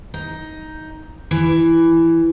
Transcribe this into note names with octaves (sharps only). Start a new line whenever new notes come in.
D#4
E3